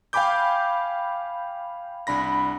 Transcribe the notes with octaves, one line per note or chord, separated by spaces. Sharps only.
F5 G5 G#5 B5 D6 G6
C2 D4 B5 A#6